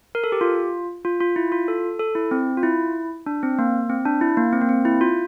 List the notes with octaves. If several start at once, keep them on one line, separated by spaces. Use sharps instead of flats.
A#4
A4
G4
F4
F4
F4
E4
F4
A4
A4
E4
C4
F4
E4
D4
C4
A#3
C4
D4
E4
A#3
C4
A#3
C4
E4
F4